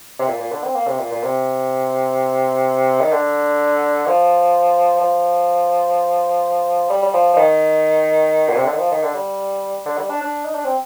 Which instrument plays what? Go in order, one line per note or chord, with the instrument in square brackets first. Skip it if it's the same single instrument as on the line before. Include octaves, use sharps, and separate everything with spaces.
[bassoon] C3
A#2
A#2
D3
C4
A#3
C3
A#2
A#2
C3
D#3
D3
F3
F3
G3
G3
F3
F3
D#3
A#2
C3
D3
D#3
F3
D#3
D3
G3
D3
G3
D4
D4
D#4
D4
C4